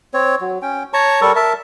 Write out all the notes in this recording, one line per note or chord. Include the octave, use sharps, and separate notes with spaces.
C4 C#5
F#3
C#4 G5
C#5 A5 A#5 C#6
G3 A4 A#4 C#6
A#4 E5 A5